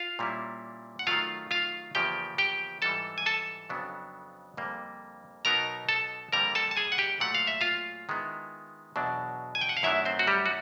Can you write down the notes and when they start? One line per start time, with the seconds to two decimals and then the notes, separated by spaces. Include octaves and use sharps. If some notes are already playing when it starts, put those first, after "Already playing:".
Already playing: F4 F5
0.19 A#2 G3 A#3 C#4 E4
0.99 F#5
1.07 D#3 F#3 A3 F4 F5
1.51 F4 F5
1.95 E2 C#3 F3 A#3 G4 G5
2.38 G4 G5
2.82 G#2 E3 G3 A4 A5
3.18 G#5
3.26 A4 A5
3.69 F2 C#3 F#3 B3 D4
4.57 F2 D3 G3 A#3
5.45 B2 F#3 B3 D#4 A#4 A#5
5.89 A4 A5
6.32 F2 D3 G3 A#3 A#4 A#5
6.55 A4 A5
6.71 A5
6.77 G#4 G#5
6.92 F#5
6.98 G4 G5
7.20 A#2 F#3 A3 F#5
7.35 F5
7.47 E5
7.61 F4 F5
8.09 D#3 G#3 B3 E4
8.96 E2 B2 F#3 B3 D4
9.55 G#5
9.61 G5
9.69 F#5
9.77 F5
9.83 F#2 D#3 F#3 A3 D4 E4 E5
10.05 C4 C5
10.19 F#4
10.27 G3 G4
10.46 F#4